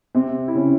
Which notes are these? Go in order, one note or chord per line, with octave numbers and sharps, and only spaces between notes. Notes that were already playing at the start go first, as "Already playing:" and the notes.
C3 C4
E4
C#3 C#4